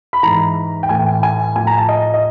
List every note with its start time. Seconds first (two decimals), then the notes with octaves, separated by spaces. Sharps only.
0.13 B5
0.23 G#2 E3 A#5
0.83 G5
0.89 A2 E3 G#5
1.23 G#5
1.56 A2 F3 G#5
1.67 A#5
1.78 A5
1.89 D#5
2.14 D#5